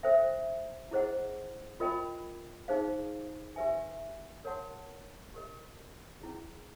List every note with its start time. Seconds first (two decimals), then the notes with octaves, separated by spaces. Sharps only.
0.03 A4 C5 E5 G5
0.91 E4 G#4 C5 D#5 F#5
1.80 F4 A#4 D#5 G5 B5
2.68 D#4 G#4 C5 F5
3.56 G4 B4 E5 G#5
4.45 A#4 C#5 F#5 A5 C6
5.34 G4 A#4 D#5
6.22 C#4 E4 G#4